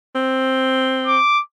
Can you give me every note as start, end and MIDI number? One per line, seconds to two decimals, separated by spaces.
0.15 1.19 60
1.07 1.41 86